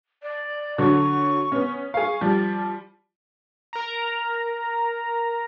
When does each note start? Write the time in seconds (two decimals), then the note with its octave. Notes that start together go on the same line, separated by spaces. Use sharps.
0.23 D5
0.78 D3 F#3 C#6
1.52 B3 C#4
1.94 G#4 F5 C#6
2.21 F3 G3 D5
3.73 A#4 A#5